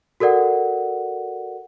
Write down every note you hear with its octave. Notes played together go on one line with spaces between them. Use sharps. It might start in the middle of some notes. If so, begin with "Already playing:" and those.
F#4 A4 A#4 D5 F#5